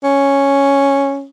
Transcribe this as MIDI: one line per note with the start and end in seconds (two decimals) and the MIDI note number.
0.04 1.26 61